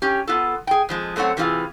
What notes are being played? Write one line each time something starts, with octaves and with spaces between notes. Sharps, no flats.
C#4 G4
B3 F4 A4
G#4 G5
F2 F3 G#3
F#2 A3 C4 C#5 F#5
C3 E3 G#3 B3 F4 G#4